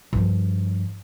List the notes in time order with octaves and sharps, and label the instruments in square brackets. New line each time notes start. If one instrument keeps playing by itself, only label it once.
[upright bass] G2 F3